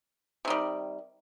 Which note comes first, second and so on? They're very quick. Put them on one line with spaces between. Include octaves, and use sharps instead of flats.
C3 D#3 G3